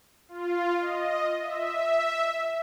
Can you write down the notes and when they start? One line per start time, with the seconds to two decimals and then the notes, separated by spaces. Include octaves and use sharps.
0.29 F4
0.81 D#5
1.39 E5